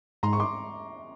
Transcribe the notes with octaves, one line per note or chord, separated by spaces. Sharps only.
G#2 A#5 C6
C#6
C6 D6